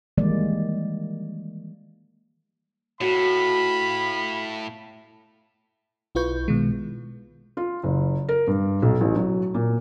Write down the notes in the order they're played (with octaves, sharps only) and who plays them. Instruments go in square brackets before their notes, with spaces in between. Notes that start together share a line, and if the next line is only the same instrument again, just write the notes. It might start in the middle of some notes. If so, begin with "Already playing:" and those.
[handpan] D#3 E3 G3 G#3 A#3 D5
[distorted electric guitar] A2 [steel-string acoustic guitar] F#4 C#5 [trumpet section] F5 B5
[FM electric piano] B1 E4 F4 B4 C#6 G6
B2 D#3 G#3
[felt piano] F4
F#1
A#4
G2
B1
A1
F#3
A#2